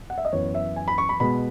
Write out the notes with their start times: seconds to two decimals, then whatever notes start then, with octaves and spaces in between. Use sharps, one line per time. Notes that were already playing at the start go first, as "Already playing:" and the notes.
0.10 F#5
0.18 E5
0.25 D#5
0.33 F#2 E3 B3 C#5
0.55 E5
0.76 G#5
0.88 B5
0.98 C#6
1.09 B5
1.20 B2 G#3 B3 B5